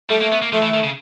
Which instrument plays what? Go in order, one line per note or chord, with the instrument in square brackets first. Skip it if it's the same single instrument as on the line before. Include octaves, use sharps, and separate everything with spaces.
[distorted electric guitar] G3 [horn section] A3
[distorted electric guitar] A#3
B3
A#3
[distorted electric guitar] F3 [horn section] A3
[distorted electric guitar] E3
D#3
C#3